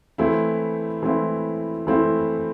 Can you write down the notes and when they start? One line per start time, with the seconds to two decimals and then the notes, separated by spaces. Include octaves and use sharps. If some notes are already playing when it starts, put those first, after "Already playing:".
0.18 E3 A3 C4 E4
1.03 E3 A3 C4 E4
1.87 E3 A3 C4 E4